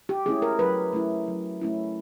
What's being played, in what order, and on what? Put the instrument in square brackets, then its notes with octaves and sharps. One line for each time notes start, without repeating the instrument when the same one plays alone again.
[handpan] G4
A3 C#4 E4 G#4
A#4
F#3 B4
A3 C#4 E4
F#3
A3 C#4 E4